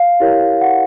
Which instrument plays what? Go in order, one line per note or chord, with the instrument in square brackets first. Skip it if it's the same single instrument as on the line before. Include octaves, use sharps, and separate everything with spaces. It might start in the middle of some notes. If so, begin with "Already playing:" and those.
Already playing: [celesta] F5
E4 G4 A#4 C#5
F#5